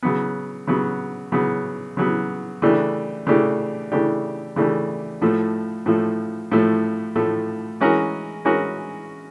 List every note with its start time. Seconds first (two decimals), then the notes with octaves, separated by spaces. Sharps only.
0.03 C#3 F#3 B3
0.67 C#3 F#3 B3
1.32 C#3 F#3 B3
1.97 C#3 F#3 B3
2.62 C#3 E3 A3 D4 G4
3.27 C#3 E3 A3 D4 G4
3.92 C#3 E3 A3 D4 G4
4.56 C#3 E3 A3 D4 G4
5.22 A2 F3 A3
5.86 A2 F3 A3
6.52 A2 F3 A3
7.16 A2 F3 A3
7.80 E3 G#3 C#4 F#4 A#4
8.45 E3 G#3 C#4 F#4 A#4